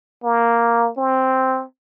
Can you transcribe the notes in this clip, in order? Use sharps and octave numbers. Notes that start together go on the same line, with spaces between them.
A#3
C4